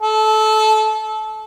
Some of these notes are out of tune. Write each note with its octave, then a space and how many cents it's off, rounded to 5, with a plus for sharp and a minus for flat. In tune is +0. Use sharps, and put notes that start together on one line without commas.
A4 -20